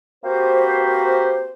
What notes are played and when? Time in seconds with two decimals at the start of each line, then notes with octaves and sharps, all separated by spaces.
0.24 A#3 C4 F#4 G4 B4 C5